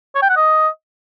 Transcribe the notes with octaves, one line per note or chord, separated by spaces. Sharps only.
C#5
G5
F#5
D#5